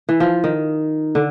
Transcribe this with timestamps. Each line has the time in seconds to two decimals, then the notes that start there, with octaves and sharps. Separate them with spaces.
0.09 E3
0.20 F3
0.44 D#3
1.15 D3